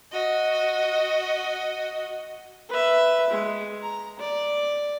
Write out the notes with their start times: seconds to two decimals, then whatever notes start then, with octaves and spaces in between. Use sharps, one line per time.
0.11 F#4 D#5
2.69 B4 E5
3.30 G#3
3.83 A#5
4.19 D5